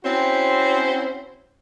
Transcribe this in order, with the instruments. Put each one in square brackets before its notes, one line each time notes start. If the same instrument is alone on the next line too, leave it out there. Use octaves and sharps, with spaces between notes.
[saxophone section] C4 C#4 E4 F#4 C5